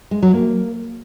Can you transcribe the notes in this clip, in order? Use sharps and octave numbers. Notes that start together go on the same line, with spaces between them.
G#3
F#3
A#3